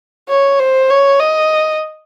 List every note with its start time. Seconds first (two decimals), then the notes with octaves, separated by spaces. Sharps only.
0.29 C#5
0.59 C5
0.90 C#5
1.20 D#5